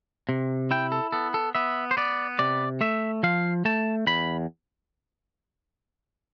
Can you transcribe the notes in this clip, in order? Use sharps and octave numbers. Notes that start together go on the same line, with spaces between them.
C3
E4 G5
A4
B3 A4
A4
B3 E5
C5
B3 D5
C3 D5
A3 E5
F3 F5
A3 A5
E2 B5